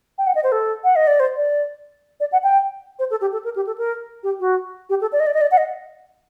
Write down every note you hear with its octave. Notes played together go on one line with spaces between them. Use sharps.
G5
F#5
D#5
C5
A4
F#5
D#5
D5
C5
D5
D5
F#5
G5
C5
A4
G4
A4
A#4
G4
A4
A#4
G4
F#4
G4
A4
D5
D#5
D5
D#5
D5
F#5
D#5